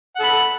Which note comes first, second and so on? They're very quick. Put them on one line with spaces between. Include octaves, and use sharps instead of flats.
F#5 A4 B5